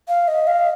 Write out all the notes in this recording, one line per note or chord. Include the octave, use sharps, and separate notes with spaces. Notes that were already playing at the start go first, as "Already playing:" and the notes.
F5
D#5
F5